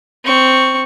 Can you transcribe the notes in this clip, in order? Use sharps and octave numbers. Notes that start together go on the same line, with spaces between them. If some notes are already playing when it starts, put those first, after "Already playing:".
C4 C#6